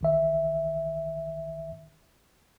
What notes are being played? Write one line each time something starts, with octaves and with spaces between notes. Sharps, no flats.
A#1 D#3 E5